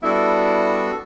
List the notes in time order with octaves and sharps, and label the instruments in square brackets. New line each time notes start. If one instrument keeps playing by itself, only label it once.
[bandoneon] G3 B3 D4 F#4 A4 [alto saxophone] E4